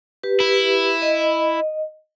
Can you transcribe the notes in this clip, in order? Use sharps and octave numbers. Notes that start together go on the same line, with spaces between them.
G4 B4
E4
D#5